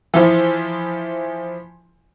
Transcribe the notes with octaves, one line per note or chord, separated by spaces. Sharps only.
E3 F3